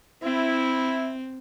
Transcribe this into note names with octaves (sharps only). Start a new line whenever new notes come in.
C4 E4